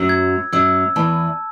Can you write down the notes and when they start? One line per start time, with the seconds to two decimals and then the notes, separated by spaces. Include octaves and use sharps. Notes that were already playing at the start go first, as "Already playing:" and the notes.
Already playing: F#2 F#3 E6
0.09 G#6
0.52 F#2 F#3 E6
0.96 E2 E3 A5